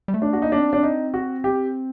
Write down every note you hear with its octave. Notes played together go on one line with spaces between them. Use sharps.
G3
A3
D4
A#3 F#4
D#4
D4
C4
D4
D#4
F#4
G4